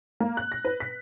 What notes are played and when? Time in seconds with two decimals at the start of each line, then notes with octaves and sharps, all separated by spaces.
0.20 A#3
0.37 F#6
0.52 A#6
0.65 B4
0.80 B6